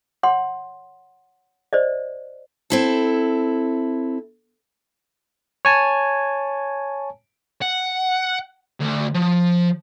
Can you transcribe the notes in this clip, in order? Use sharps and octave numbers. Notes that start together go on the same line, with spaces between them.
C#5 F#5 C6
C5 D5 D#5
C4 E4 A4
C#5 G#5 A5
F#5
D2
F3